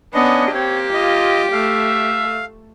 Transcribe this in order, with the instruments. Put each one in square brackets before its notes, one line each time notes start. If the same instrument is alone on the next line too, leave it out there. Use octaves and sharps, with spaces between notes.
[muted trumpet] A#3 [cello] B3 [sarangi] C#4 [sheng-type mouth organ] D4 D#5
[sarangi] C4 [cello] G4 [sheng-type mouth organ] C#5
[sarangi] F4 [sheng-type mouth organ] D#5
[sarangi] A3 [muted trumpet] E5 [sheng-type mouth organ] F5